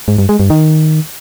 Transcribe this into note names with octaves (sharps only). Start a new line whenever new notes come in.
G#2
G2
G#3
G2
D#3